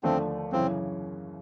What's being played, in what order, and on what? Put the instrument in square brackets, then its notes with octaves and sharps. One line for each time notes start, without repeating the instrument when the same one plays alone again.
[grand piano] D#2 D3 F3 A3 D4 [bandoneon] C4
[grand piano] F#2 C#3 E3 [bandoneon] C4